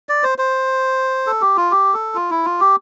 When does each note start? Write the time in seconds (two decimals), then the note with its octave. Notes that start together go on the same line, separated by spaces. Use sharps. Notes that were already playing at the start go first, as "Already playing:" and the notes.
0.09 D5
0.23 C5
0.38 C5
1.27 A4
1.41 G4
1.57 F4
1.71 G4
1.94 A4
2.15 F4
2.30 E4
2.45 F4
2.60 G4